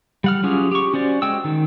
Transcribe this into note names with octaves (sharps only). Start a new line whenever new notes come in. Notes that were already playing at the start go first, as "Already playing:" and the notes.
G3 F#5 F6
F#3 C#4 F4 G4 G#4
G4 C#6
C#4 F#4 C5 D5
G#3 G5 E6
D#3